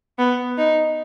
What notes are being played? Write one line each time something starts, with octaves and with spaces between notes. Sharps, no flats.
B3
D#4